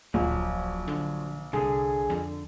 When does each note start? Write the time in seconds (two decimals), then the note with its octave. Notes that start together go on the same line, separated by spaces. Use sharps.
0.14 D1 A#1 F3 F#3
0.88 D3
1.53 C2 D3 G#4
2.10 F2